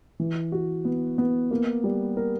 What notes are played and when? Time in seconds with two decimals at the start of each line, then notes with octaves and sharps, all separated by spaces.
0.19 E3
0.52 F#4
0.85 B3
1.18 B3
1.51 A#3
1.84 G3
2.17 A#4